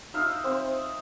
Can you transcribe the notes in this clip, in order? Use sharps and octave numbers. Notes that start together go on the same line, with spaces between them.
D#4 E5 F5
C4